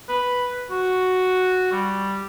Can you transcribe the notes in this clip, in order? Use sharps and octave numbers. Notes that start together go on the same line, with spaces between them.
B4
F#4
G3